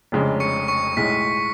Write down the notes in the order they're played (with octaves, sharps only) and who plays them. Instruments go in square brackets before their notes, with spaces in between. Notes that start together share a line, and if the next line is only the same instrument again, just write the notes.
[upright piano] F1 F2 C#3 G#3 D4
[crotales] C#6 C#7
C#6 C#7
[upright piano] B1 A2 G#3 [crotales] B6